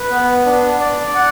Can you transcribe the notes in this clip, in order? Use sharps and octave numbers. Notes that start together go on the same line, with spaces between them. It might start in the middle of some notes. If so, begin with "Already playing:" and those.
Already playing: B4
B3
D4
D5
F#5